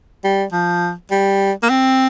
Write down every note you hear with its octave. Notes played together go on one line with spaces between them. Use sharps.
G3
F3
G3
A#3
C4